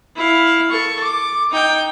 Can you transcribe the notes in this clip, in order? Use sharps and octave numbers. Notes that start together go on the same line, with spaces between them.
E4 F5
A4 C#6
D6
D#4 G5